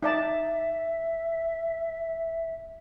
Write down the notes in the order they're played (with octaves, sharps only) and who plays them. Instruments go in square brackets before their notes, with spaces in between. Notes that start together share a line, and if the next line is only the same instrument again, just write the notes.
[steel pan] D#4 D5 A5 [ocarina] E5